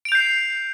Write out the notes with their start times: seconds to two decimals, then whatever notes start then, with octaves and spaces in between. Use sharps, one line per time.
0.05 D7
0.09 F7
0.12 G6
0.15 C7